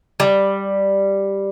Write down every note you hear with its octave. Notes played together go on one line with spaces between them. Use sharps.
G3